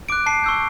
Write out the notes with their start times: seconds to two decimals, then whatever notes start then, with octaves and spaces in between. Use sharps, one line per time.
0.09 D6 F#6 D7
0.26 A5 C7
0.44 C#6 E6 G6